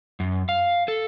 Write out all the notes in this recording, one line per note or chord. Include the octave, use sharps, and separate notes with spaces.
F#2
F5
A4